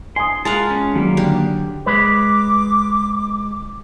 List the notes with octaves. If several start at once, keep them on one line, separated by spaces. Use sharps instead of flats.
G#5 C6 D#6
G#3 F4 A#4 F5 F#5 A5
C#4
D#3 F#3 G3 A#3
D3 G4
G#3 B4 D6